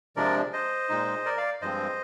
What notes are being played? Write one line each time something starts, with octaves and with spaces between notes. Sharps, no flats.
C3 F3 G#3 D4 A#4 D5
C5 D#5
A#2 G#3 D#4
A#4 D5
D5 F5
G2 F3 G#3 C4 C5 D#5